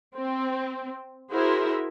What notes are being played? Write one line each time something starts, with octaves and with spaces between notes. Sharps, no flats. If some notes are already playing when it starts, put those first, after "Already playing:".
C4
E4 F#4 G#4 A#4 C5 E5